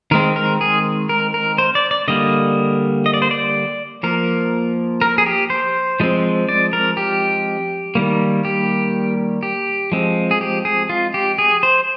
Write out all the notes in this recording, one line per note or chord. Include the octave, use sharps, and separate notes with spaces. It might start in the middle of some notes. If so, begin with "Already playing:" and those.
D#3 G#3 C4 A#4
A#4
G#4
A#4
A#4
C5
D5
D5
D3 G3 A#3 D#5
D#5
D5
C5
D5
F3 A#3 A#4
A#4
G#4
G4
C5
F3 G#3 C4
D5
A#4
G4
D#3 G3 A#3
G4
G4
F3 G#3 C4
G#4
G4
G#4
F4
G4
G#4
C5